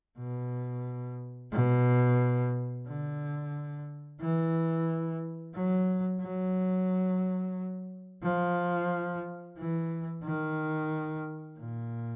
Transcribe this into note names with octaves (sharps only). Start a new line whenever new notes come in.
B2
B2
D3
E3
F#3
F#3
F3
E3
D#3
A#2